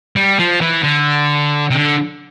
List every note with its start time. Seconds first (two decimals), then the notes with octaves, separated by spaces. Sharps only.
0.16 G3
0.39 F3
0.61 E3
0.84 D3
1.70 C3
1.75 D3